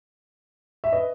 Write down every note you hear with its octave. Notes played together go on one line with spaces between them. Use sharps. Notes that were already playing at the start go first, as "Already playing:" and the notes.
E5
B4 D#5